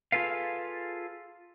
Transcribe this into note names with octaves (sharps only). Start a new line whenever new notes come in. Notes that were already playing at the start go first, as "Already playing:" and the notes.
F4 G#4 A4 B4 F5